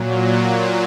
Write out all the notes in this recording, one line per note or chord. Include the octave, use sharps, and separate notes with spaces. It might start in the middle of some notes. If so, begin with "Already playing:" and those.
Already playing: A#2 F#3